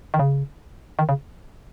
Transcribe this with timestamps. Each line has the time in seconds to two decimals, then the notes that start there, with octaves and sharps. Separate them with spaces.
0.14 D#3
0.19 C#3
0.99 D#3
1.09 C#3